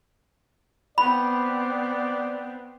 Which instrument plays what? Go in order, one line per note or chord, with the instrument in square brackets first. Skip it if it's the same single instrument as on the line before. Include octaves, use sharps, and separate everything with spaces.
[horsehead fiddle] B3 C4 [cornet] D5 [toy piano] B5